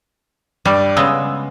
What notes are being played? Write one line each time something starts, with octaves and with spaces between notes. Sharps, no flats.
G2 G3 D5 D6
C#3 G#3 B3 E6